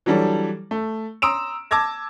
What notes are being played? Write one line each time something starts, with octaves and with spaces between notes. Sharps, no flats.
E3 F#3 G3 D4 A4
A3
A#5 C6 D#6 E6 D7 E7
A5 D6 E6 G#6 A#6